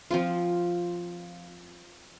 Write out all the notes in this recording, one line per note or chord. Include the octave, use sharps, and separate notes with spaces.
F3 C4 F4